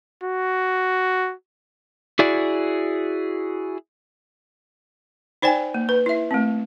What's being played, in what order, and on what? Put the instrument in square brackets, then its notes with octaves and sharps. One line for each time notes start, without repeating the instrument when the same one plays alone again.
[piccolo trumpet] F#4
[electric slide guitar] E4 F#4 G#4 D5
[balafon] D#4 C5 D5 G5 G#5
A#3
B4
E4 E5
A3 C4